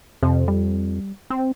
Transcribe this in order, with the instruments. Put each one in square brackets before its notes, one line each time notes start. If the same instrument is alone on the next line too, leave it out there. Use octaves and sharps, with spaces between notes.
[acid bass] F2 [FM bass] C3
[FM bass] G3
[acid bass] C4